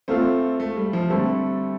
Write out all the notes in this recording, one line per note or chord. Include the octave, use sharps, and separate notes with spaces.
A3 C4 F4 A4 F5
A3
G3
F3
D3 G3 A3 C4 A4